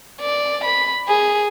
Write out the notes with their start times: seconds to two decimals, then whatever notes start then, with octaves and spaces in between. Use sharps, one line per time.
0.21 D5
0.64 B5
1.08 G#4